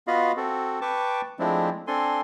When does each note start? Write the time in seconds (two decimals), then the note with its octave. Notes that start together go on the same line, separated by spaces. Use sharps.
0.07 B3 F4 F#4 D#5 F5 B5
0.37 C4 F#4 A4
0.82 B4 G5 A5 C#6 D6
1.39 F3 G#3 A3 C4 D4 E4
1.87 C4 D4 A4 G#5 C6